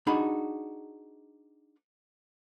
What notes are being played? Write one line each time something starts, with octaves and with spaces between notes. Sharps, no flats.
D4 D#4 F#4 G#4 B5